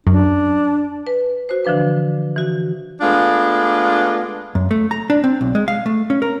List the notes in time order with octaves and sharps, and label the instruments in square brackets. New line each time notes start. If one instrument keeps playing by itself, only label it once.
[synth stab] F#2 [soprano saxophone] D4
[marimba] B4
F#4 C5
D3 E3 F3 D4 B4
E3 F#4
[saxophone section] G#3 A3 B3 D4 F4
[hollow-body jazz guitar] F#2
A3
A#5
D4
C4
B1
G#3
F5
A3
C#4
A#4